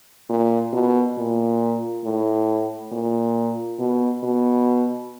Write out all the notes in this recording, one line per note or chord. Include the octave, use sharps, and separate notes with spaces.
A#2
B2
A#2
A2
A#2
B2
B2